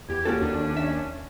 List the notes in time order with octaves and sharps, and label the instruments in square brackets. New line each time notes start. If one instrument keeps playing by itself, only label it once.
[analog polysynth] E2 G4 [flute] G#6
[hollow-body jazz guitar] A#3 F#4 A4 [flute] C#4
[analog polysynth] D#2 D4
[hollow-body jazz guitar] E5